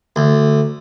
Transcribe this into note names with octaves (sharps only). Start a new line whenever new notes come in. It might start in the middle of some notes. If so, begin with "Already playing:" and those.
D2